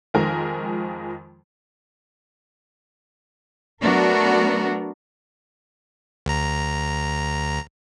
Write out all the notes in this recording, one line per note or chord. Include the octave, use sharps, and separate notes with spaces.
F2 D#3 F3 G#3 A#4
F#3 A3 B3 D4 F#4 A#4
D2 A#5